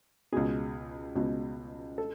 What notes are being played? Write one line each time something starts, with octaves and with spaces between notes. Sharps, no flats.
C#2 B2 G#4
C#2 B2
A4